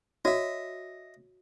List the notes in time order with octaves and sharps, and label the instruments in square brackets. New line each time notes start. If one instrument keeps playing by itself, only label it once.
[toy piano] F#4 [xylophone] C#5 [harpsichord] D#5 E5